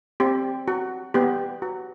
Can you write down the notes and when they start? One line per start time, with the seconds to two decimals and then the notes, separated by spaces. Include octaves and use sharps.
0.20 C4 G4
0.68 F#4
1.14 B3 G4
1.62 F#4